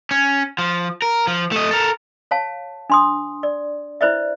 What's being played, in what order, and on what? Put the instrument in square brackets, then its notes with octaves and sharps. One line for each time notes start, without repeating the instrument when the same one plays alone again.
[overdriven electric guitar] C#4
F3
A#4
F3
A3 D#5
A4 A#4
[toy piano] C#5 F5 A5
D4 C6 D#6
D5
E4 B4 C5 D5 E5